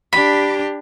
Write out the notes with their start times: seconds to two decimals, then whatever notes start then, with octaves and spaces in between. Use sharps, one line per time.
0.13 D4 G4 B5